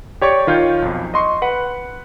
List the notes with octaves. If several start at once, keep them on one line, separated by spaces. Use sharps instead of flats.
G4 C#5 D5 C#6
D#3 F4 C#5 G6
B1 F2
D#5 C6 C#6
B4 F#5 B5